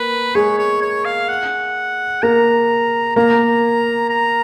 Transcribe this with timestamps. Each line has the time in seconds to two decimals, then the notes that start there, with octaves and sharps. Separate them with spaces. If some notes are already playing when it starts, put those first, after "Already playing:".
Already playing: A#3 B4
0.35 G#3 G#4 C#5
0.59 C#5
0.82 C#5
1.05 F5
1.28 F#5
2.23 A#3 A#4 A#5
3.16 A#3 A#4 A#5
4.10 A#5